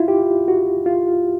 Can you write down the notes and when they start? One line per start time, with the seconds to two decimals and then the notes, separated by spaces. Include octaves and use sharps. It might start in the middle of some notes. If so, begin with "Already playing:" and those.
Already playing: E4 F4
0.08 G4
0.48 F#4
0.86 F4